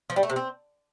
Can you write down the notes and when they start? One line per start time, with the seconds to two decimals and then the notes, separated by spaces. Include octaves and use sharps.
0.10 F3
0.16 G3
0.23 A3
0.30 C3
0.36 C4